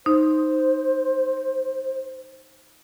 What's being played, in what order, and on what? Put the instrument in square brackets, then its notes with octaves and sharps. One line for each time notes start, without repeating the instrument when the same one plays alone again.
[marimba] D#4 [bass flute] C5